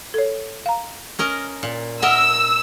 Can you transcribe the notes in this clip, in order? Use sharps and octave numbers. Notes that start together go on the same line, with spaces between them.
A4 C#5
F5 A#5
C#4 A#4 D#5
A#2
A#4 D#5 E5 F#5 E6